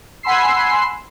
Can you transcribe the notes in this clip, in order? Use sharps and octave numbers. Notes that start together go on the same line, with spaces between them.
F#5 G#5 B5 C6 E6 C7